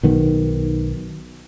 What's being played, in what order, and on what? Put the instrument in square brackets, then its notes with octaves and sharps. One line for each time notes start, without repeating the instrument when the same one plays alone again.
[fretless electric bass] B1 D#3 B3